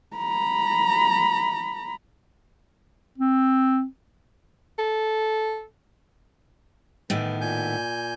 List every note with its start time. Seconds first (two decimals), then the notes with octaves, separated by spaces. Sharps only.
0.16 A#5 B5
3.18 C4
4.79 A4
7.10 A2 D#3 E3 B3
7.41 A#2 G#5 G6